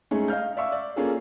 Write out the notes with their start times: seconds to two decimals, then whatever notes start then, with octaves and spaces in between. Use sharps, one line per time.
0.11 G#3 A3 C#4 D#4 G#4
0.28 D#5 F5 F6 G6
0.57 D5 E5 F5 C#6 E6
0.72 D5
0.96 A#3 C#4 F4 G#4 A4